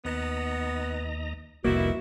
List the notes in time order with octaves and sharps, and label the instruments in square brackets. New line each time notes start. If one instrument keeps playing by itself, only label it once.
[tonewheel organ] D#2 D#5 A#5 [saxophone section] B3
[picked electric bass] F1 C2 A#3 [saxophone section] B3 D#4 E4 [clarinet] F#4 [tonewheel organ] E5